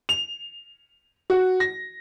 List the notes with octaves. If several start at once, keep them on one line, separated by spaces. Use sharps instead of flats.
F7
F#4
A#6